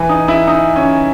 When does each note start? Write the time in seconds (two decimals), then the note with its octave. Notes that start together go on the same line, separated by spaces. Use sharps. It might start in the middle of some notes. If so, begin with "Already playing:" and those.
Already playing: E3
0.09 D#4
0.28 E4
0.47 D#4
0.76 C#4